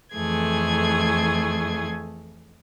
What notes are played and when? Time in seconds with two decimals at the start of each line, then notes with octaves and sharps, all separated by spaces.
0.14 F2 E3 A3 G#4 G#6